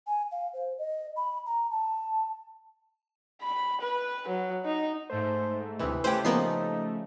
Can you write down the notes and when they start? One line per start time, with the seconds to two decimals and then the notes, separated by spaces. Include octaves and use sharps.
0.07 G#5
0.32 F5
0.53 C5
0.78 D#5
1.16 B5
1.46 A#5
1.71 A5
3.42 B5
3.81 B4
4.28 F#3
4.65 D#4
5.10 G#2 A3 C5
5.79 D2 C3 E3
6.04 C#3 A3 C#4 G4 B4 C5 G5
6.25 F3 A#3 B3 D#4 C7